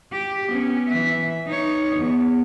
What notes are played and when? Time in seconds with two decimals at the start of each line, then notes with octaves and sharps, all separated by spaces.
0.11 G4
0.48 B3 C#4
0.88 E3 E5
1.46 D#4 C#5
1.95 E2